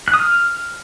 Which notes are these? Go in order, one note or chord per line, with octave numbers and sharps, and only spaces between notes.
F#6
D#6
F6